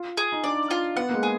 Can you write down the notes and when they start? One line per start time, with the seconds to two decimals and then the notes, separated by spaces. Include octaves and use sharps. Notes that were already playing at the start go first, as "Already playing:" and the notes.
Already playing: F4
0.17 G#4
0.32 D#4
0.44 D4 D5
0.71 F4
0.96 B3 F#5
1.09 A#3
1.14 G#3
1.23 G#4